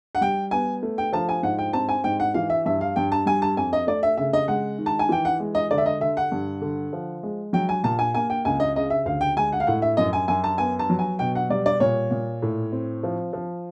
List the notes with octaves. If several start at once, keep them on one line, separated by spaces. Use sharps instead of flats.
F#5
G3 G5
B3 G#5
A3
G5
F3 A5
G#5
G#2 F#5
G5
C4 A5
G#5
G#2 G5
F#5
E3 F5
E5
G2 E5
F5
G2 G5
A5
G3 G#5
A5
F2 G#5
D#5
A3 D5
E5
C#3 E5
D#5
G#3 F#5
D#3
A5
G#5
E3 G5
F#5
G#3
D#5
D3 D5
E5
D#5
D3 E5
F#5
G2
D3
F3
G#3
F#3 G5
G#5
A#2 A5
G#5
A#3 G#5
G5
C#2 G#5
D#5
C#3 D#5
E5
D2 F5
G5
G#3 G#5
F#5
F5
A2 F#5
E5
F#2 D#5
G#5
F#2 G#5
A5
B3 G#5
A5
F#3
G#5
B2 G5
F#5
G3 D5
D5
A#2 C#5
A#2
A2
C4
F3
F3